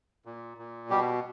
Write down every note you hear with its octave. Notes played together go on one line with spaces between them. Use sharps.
A#2
A#2
B2 G3 G4